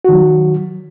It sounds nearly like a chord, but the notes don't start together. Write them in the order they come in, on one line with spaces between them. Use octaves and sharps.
F#4 D#3 F#3